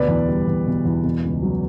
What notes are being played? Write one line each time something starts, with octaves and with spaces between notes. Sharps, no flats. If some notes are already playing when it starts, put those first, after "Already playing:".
Already playing: D2 B2 B4 D5
E2
G3
E2
B2
E2
B2
C#2
F#3